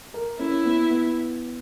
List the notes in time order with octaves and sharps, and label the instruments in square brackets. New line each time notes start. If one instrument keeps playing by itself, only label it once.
[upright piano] A#4
[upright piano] C#4 [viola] E4
[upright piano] B3
B3